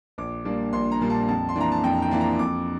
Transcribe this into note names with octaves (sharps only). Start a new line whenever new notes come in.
A#1 D6
A#2 G3 A#3 D4
A#1 C6
A#5
A#2 G3 A#3 D4
A5
F2 A5
C6
E3 A#3 D4 A#5
A5
F2 G5
G5
E3 A#3 D4
A#5
F2 D6